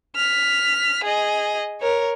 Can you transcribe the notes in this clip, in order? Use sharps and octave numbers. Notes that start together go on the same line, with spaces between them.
F6 B6
G#4 D#5
A#4 C#5